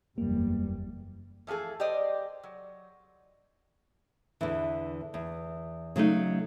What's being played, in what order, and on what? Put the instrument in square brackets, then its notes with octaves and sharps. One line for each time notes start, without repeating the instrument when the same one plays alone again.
[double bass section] F#1 E2 G3 [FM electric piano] A#3
[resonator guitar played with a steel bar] E3 F3 A3 G#4 A4
G4 C5 D5 D#5
F#3
[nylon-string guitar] E2 D3 E3
E2
C#3 F#3 A3 D#4